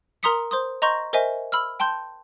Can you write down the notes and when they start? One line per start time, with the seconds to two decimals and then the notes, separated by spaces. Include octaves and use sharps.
0.23 A#4 A#5 C6 D#6 B6 C#7
0.51 C5 C6 D#6
0.82 D#5 A#5 C6 C#6 G6 A#6
1.13 A#4 C5 D#5 E5 G#5
1.52 B5 E6 F6
1.80 G5 A5 C6 G6